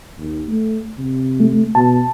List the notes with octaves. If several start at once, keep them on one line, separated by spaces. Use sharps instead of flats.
D#2
A3
C3
A3
B2 A5